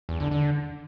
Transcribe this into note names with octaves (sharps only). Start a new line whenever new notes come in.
E2
D3
D3